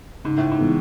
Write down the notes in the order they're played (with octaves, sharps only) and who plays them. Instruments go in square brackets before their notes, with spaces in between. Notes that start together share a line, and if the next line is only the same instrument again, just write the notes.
[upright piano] G#2 [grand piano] C#3
[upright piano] A2
G#2
[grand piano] E3 G#3 B3